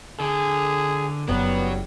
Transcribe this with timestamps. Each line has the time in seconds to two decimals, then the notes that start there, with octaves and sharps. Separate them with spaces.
0.20 D3 G#4
1.29 F#1 F#2 F#3 G3 B3